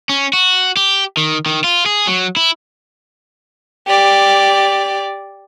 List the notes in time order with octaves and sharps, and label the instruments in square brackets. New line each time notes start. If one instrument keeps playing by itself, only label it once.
[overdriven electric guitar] C#4
F#4
G4
D#3
D#3
F4
G#4
F#3
E4
[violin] G4 D5